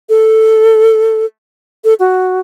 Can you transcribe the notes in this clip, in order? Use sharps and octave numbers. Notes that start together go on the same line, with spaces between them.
A4
A4
F#4